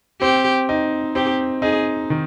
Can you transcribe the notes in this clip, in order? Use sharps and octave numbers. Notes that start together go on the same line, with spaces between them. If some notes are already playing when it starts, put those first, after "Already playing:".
C4 G4
D#4
C4 G4
D#4 G#4
D#3